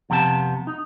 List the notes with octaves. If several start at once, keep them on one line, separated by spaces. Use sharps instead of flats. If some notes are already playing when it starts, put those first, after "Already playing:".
F2 C3 B3 G#4 A5
D#4